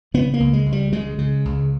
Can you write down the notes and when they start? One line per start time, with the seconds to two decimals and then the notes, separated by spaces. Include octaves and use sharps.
0.14 C#3 B3
0.34 A#3
0.40 C#2
0.53 G#3
0.66 C#2
0.72 G3
0.92 C#3 G#3
1.19 C#3
1.45 C#2